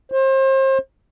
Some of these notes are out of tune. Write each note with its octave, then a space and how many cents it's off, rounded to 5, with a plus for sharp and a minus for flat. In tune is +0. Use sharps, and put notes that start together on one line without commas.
C5 +35